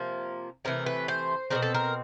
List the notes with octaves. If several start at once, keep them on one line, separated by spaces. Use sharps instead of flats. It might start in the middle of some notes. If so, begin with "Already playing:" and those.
Already playing: C3 F3 A#3
C3 E3 A3 A#4
B4
C5
B2 G3 C4 A#4
A4
A#4